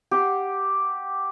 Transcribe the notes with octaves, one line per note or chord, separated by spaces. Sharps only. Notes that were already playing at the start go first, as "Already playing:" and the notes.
G4 F#5 C6